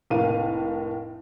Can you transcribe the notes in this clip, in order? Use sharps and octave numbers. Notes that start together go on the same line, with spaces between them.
F1 A2 A#3 F5 D#7